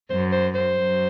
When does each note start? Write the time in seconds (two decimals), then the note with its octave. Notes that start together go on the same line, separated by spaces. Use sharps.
0.10 F#2 C5
0.32 C5
0.55 C5
0.77 F#2